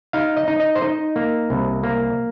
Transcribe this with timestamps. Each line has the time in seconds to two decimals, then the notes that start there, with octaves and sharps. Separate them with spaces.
0.13 D#4 F5
0.37 D#5
0.48 D#4
0.60 D#5
0.75 C5
0.81 D#4 D#5
1.16 A#3
1.50 C2
1.83 A#3